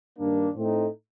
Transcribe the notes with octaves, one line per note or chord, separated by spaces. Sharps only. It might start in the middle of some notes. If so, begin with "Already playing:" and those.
G2 D#3 A#3 D4
A2 A3 C4 D#4